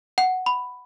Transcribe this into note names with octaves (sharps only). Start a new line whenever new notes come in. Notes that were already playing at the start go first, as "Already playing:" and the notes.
F#5
B5